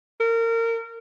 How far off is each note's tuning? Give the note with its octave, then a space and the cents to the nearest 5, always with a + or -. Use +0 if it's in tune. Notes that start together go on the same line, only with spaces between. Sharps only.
A#4 -25